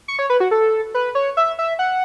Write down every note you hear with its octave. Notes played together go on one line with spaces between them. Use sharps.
C#6
C#5
B4
F#4
A4
B4
C#5
E5
E5
F#5